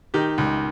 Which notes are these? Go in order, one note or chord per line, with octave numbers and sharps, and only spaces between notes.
D#3 G4
C#2